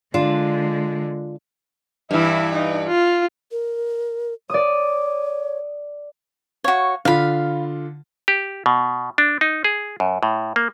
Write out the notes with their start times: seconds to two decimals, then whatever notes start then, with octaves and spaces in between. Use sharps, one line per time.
0.14 D3 G#3 D4 F4
2.11 G2 E3 E4
2.54 D#4
2.87 F4
3.52 A#4
4.50 C#5 D5 D#6
6.64 F#4 C#5 F5
7.05 D3 F4 F5 B5
8.28 G4
8.66 B2
9.18 D4
9.41 D#4
9.64 G#4
10.00 F#2
10.23 A2
10.56 A#3